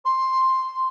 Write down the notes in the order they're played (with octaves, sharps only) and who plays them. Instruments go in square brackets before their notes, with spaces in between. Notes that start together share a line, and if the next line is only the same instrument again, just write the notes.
[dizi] C6